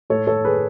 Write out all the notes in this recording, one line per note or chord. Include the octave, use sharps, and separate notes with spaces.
A2 A4 C#5
A4 C#5
G#4 B4